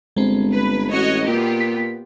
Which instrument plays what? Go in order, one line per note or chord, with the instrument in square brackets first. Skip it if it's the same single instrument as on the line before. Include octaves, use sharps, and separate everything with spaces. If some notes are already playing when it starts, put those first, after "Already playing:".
[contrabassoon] G1 [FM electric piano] G#3 C4
[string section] B4
[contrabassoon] A1 [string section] F#4 C#5 D#5
[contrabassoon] A#2 [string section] B3 F4 G4
[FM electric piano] B6